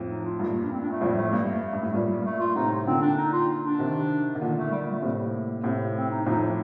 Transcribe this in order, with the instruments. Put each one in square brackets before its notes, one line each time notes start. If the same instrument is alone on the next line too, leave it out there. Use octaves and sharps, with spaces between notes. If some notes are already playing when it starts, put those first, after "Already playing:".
Already playing: [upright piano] F2 A2
[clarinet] D#4
F4
[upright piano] G2 A#2 [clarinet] A3
[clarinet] A#3
D4
C4
D4
A3
[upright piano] F2 A2 [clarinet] G3
[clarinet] A3
[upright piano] G2 [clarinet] A#3
[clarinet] A#3
A3
[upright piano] G2
A2
[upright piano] G2 A#2 [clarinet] G3
[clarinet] G3
A3
F4
[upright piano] A2 C3 [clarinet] D#4
[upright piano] A#2 D3 [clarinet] C4
[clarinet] D4
D#4
F4
D4
[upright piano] C3 D#3
D#3
[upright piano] A#2 D3 [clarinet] A#3
[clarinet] A3
G3
G3
A3
[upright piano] A2 C3 [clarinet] A3
[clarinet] A#3
[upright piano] A2 C3
[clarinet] C4
D#4
[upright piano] F2 A2 [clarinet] D#4